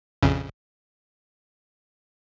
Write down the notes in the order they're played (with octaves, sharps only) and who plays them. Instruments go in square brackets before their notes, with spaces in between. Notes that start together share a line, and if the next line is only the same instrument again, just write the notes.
[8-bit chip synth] A#1 F2 C#3